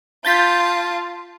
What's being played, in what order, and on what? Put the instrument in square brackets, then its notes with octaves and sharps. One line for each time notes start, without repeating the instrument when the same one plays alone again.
[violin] F4 A5 [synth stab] G6 A6 B6